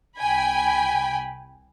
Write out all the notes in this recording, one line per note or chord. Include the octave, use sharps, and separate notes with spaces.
C2 G5 G#5 B5